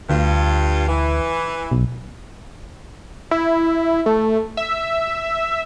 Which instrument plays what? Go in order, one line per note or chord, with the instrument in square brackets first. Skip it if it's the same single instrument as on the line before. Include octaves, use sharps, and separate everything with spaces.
[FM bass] D2 [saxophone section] G2 F4
[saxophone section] E3
[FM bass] B1
[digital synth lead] E4
A3
E5